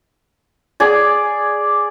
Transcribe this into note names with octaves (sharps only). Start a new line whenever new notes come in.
G#4 D5